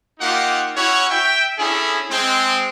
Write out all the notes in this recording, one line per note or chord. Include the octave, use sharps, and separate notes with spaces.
A#3 D#4 F4 G4 F#5
C#4 E4 F#4 C#5
E5 G5
C#4 D4 E4 G#4 A4
G#3 C4